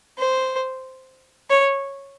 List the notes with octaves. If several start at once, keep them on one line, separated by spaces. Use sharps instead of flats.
C5
C#5